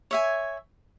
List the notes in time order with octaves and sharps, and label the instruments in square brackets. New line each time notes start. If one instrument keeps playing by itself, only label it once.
[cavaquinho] C#5 E5 G#5